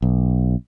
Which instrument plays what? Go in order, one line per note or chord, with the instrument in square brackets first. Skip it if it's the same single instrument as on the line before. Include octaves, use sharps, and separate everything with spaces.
[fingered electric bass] B1